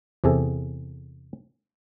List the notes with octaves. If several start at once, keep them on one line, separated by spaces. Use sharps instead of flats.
E2 C3 G#4 A4